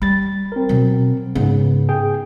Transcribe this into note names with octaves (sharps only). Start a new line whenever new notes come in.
G3 B5 A6
C4 A#4
B2 F#3
G#2 C#3 B3
G#4 G5